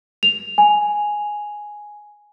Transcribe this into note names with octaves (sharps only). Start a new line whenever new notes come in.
F7
G#5